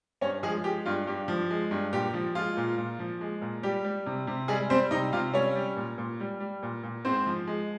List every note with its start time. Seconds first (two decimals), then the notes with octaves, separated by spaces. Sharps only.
0.21 G2 C#4 C#5
0.43 F3 G#3 G#4
0.64 G#3 G4
0.86 G2 F4
1.07 G2 G4
1.28 F3
1.50 G#3
1.71 G2
1.93 A#2 G4
2.14 F3
2.35 G#3 F4
2.57 A#2
2.78 A#2
2.99 F3
3.21 G#3
3.42 A#2
3.63 G3 G4
3.84 G3
4.06 C3
4.27 C3
4.48 G3 G#3 G#4
4.70 G3 C4 C5
4.91 C3 D#4 D#5
5.13 C3 F4 F5
5.34 G3 C#4 C#5
5.55 G3
5.76 A#2
5.98 A#2
6.20 G3
6.40 G3
6.63 A#2
6.83 A#2
7.05 G#2 C4 C5
7.27 F3
7.47 G#3